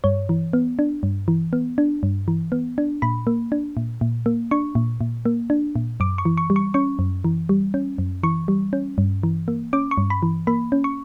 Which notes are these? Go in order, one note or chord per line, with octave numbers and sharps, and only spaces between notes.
G2 C#5
E3
B3
D4
G2
E3
B3
D4
G2
E3
B3
D4
A#2 B5
A#3
D4
A#2
A#2
A#3
D4 C#6
A#2
A#2
A#3
D4
A#2
F#2 D6
C#6
E3
C#6
G3
C#6
C#4 C#6
F#2
E3
G3
C#4
F#2
E3 C#6
G3
C#4
G2
E3
A#3
C#4 D6
C#6
G2
B5
E3
A#3 B5
C#4
C#6